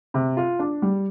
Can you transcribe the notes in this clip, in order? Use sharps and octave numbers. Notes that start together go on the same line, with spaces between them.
C3
F4
D4
G3